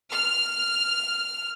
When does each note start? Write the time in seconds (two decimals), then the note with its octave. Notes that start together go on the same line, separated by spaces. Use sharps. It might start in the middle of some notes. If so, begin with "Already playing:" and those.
0.12 F6